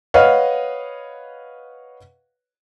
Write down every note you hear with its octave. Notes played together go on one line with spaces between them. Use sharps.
B4 C#5 D#5 F5 F#5 F6